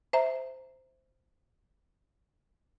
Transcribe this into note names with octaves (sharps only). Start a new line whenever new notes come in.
C5 E5 A#5